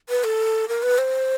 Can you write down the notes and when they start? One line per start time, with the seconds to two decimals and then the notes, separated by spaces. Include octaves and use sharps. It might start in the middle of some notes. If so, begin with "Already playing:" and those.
0.09 B4
0.24 A4
0.68 A#4
0.83 B4
0.98 C5